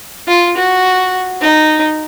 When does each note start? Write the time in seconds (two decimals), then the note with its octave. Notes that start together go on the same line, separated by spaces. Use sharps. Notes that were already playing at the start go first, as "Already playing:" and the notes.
0.28 F4
0.57 F#4
1.41 D#4